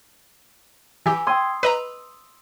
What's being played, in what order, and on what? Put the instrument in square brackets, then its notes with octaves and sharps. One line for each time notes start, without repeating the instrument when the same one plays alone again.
[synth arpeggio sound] E3 G4 [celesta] G#5 E6
[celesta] G5 E6 G#6 [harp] C6 D#6
[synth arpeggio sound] B4 D#5 A#5 [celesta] E6